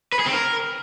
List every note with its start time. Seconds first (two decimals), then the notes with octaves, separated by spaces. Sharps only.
0.12 B4
0.19 G#4
0.26 C4
0.33 A#4